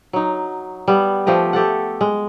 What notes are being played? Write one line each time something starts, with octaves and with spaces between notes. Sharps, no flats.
F#3 D#4
G3 B3
F3 A3 G4 D#5
A3 G4 A4 F#5
G#3